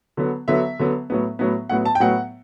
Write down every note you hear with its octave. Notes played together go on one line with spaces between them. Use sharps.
D3 F#3 B3
D3 F#3 B3 E5
D3 F#3 B3
A2 F#3 B3
A2 F#3 B3
A2 F#3 B3 F#5
A5
G5
A2 F#3 B3 F#5